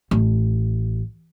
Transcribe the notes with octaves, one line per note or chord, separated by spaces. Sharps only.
A1